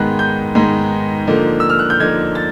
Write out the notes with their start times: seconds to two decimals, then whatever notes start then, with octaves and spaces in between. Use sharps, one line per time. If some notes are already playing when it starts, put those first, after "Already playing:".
Already playing: G#2 D#3 G#3 B3 F#6
0.19 G6
0.55 G#2 D#3 G#3 B3
1.27 D3 F3 A#3 D#4
1.60 E6
1.69 F6
1.79 F#6
1.90 G6
2.00 D3 F3 A#3 D#4 G#6
2.35 A6